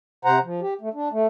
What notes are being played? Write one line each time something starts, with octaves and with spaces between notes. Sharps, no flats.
C3 C5 F#5 A#5
F3
G4
A3
D4
A3